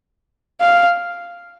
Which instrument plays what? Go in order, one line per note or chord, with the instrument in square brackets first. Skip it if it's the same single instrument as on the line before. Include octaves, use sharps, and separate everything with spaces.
[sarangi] F5